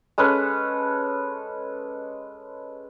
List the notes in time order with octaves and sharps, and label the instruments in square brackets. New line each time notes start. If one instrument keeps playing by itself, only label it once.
[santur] G#3 C#4 A4 B4